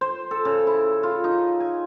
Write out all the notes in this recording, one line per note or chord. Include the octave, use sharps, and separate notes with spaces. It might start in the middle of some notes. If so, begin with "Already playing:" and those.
C5
A4
C#3
E4
F4
D#4
G#5